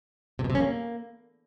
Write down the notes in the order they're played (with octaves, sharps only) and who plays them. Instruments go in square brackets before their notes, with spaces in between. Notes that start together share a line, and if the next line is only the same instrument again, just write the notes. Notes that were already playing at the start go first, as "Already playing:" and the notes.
[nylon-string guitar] C3
B2
C3
C#4
A#3